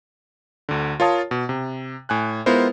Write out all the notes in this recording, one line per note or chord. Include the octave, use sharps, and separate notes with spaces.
D2 D3
F4 A#4 C#5 F5 A5 D#6
B2
C3
A2 G#5 F#6
G#3 B3 E4 F4 A#4 C5